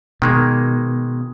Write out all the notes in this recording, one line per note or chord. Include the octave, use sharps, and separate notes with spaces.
B2 D#3 G#3 A#3